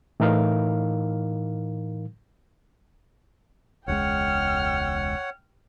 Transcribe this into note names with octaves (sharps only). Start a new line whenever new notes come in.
A2 E3 D#4 A#4 F5
E1 C#2 G#3 C#5 F#5 G5 F6